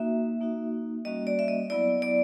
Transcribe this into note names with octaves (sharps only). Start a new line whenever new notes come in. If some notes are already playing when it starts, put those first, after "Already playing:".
Already playing: A#3 D#4 F#4 E5
A#3 D#4 F#4
G3 A#3 C#4 F#4 D#5
D5
E5
D#5
F#3 B3 E4 D5
D5